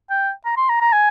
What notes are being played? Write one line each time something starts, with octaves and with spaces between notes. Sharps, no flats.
G5
A#5
C6
A#5
A#5
G#5